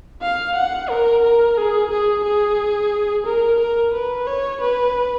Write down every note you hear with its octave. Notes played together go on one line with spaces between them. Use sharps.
F5
F#5
A#4
A#4
G#4
G#4
G#4
A#4
A#4
B4
C#5
B4